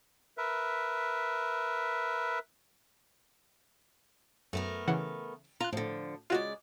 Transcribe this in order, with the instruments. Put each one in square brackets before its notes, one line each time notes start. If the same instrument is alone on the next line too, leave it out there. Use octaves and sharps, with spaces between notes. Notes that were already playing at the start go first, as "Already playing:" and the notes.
[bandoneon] A#4 B4 E5
[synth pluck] F#2 [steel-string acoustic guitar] A3 B3 A#4
[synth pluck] C#3 E3 F#5
[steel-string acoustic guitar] F4 [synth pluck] A#5 F#6
[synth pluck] A2 [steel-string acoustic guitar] D3 F3
[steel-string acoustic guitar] C#3 G#3 D5 [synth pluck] F4 F#4